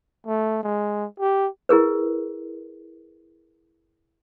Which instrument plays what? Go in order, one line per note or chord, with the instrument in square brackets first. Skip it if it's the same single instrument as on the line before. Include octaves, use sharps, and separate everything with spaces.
[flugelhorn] A3
G#3
G4
[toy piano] E4 G#4 A#4 B4